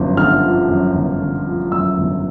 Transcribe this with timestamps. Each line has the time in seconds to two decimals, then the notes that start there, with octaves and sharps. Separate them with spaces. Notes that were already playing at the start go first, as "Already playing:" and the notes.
Already playing: G1 F#2 F3
0.17 D3 F6
0.43 F3
0.69 F#2
0.95 G1
1.21 D3
1.46 F3
1.72 F#2 E6
1.98 G1